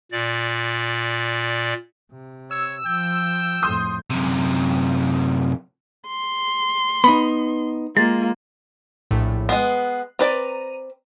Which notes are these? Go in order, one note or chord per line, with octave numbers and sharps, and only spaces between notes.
A#2 D5
C3
C#5 E6
F3 G5
F2 A2 C6 D#6 G6
F#2 C3
C6
B3 D#4 B5
G#3 A#3 F4 A6
A#1 A2
G#3 B3 F#6 C7
C4 B4 D5 A#5 D#7